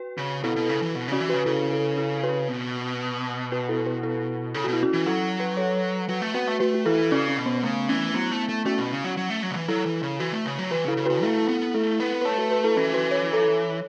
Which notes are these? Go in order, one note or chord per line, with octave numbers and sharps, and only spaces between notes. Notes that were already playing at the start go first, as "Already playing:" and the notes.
Already playing: F#4 B4
C#3
B2 E4 A4
B2
C#3
E3
B2
C#3 C#4 F#4
E3
F#4 B4
C#3
C#3 E4 A4
E4 A4
E4 A4
F#4 B4
B2
F#4 B4
E4 A4
F#4 B4
E4 A4
C#3 A4
B2 F#4
E4
C#4 F#4
E3
F#3 E4 A4
F#4 B4
A4 C#5
F#3 F#4 B4
A3
B3 F#4 B4
A3
A3 F#4 B4
F#4
E3 E4 A4
C#3 C#4 F#4
C#4
B2
B3
C#3 A3
E3 C#4
F#3 B3 E4
A3
A3
A3 C#4 F#4
B2
C#3
F#3
F#3
A3
F#3
C#3
E3
F#3 E4 A4
E3
C#3
E3 F#4 B4
A3
C#3
F#3
E3 F#4 B4
C#3 E4 A4
C#3
F#4 B4
C#3
A3 E4 A4
B3
A3 E4 A4
B3
B4
A3 A4 C#5
F#4 B4
F#4 B4
E4 A4
E3 C#4 F#4
F#4 B4
C#5
A4 C#5